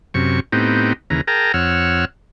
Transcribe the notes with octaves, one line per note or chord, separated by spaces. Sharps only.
F#2 C3 C#6
A2 B3 C4 D#4 G4
D#2 C#3 E3 A#5
G#4 A#4 G5 A5 A#5
F2 C#5 F#5 E6 F6